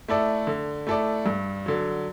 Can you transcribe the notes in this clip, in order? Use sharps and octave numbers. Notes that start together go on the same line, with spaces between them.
A3 E4 A4 D5
D3
A3 E4 A4 D5
G2
D3 F#3